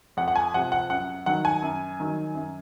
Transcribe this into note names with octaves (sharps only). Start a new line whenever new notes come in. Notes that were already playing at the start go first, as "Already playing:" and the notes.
F2 F#5
F#5
G#5
C3 F3 F#5
F#5
F#2 F#5
D#3 F#3 F#5
G#5
F#2
D#3 F#3
F#2